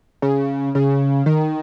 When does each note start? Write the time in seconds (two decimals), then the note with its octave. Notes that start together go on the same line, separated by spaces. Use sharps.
0.22 C#3
0.75 C#3
1.26 D#3